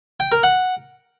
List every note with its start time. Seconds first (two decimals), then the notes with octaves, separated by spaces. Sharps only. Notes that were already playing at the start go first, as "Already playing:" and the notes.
0.20 G5
0.32 A#4
0.43 F#5